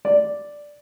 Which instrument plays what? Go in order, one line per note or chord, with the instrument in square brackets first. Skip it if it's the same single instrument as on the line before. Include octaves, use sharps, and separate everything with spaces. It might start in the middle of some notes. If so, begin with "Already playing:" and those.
[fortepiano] D5